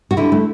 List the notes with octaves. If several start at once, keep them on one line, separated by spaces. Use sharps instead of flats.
F#4
D3 E4
A3